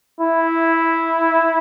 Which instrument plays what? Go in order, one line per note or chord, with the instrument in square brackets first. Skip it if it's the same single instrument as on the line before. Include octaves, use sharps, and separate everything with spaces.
[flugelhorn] E4